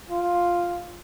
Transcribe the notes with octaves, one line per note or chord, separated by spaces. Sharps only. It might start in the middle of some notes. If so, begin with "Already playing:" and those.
F4